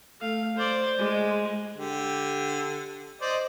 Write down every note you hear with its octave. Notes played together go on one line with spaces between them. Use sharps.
A3 F5
C5 D5
G#3
D3 G4
C5 D5 D#5